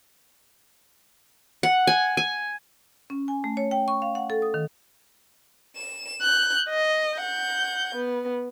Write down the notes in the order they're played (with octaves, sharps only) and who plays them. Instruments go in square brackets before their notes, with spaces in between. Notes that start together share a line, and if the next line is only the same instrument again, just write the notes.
[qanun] F#5
G#5
G#5
[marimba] C#4
G#5
A3
C#5
G5
C#6
F5
F#5
A4
D#6
D#3
[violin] E7
F#6 G6
D#5
F#5 G6
B3